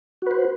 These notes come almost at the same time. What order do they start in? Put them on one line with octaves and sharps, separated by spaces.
F#4 B4 C5